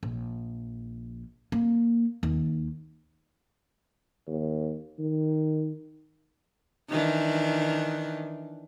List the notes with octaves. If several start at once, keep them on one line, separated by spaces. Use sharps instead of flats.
A#1
A#3
D#2
D#2
D#3
D#3 E3 D4